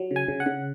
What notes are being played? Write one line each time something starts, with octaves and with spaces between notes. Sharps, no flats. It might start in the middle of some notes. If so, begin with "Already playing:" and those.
Already playing: F#3
C#3
G#5
C#3
F#5
C#3